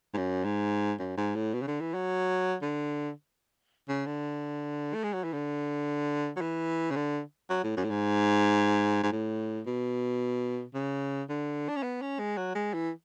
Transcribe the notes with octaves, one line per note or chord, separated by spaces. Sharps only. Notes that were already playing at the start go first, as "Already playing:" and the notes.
G#2
F#2
G#2
F#2
G#2
A2
B2
C#3
D3
E3
F#3
D3
C#3
D3
A3
G#3
F#3
E3
D3
F#3
E3
C#3
D3
F#3
A2
F#2
A2
G#2
G#2
A2
B2
C#3
D3
D4
C#4
B3
C#4
G#3
F#3
G#3
E3